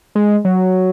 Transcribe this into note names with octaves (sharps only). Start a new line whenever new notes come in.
G#3
F#3